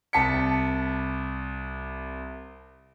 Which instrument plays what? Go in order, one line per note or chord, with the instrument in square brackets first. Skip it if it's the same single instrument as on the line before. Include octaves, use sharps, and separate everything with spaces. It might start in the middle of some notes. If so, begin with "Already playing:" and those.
[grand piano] C2 A5 B6 C#7